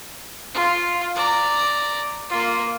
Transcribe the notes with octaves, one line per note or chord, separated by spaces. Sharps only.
F4
D5 A#5
A#3 F4